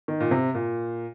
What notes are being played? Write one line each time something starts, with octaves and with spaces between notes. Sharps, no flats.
D#3
A#2
C3
A#2